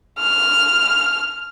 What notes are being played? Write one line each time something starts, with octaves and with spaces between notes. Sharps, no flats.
F6